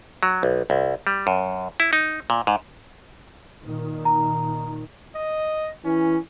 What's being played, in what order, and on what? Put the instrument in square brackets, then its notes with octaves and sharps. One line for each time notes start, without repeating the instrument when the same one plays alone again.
[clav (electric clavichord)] F#3
B1
C2
G3
F#2
E4
D#4
A#2
G#2
[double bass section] A#2 D#3
[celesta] A#5
[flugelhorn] D#5
[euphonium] E3 [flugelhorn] C#4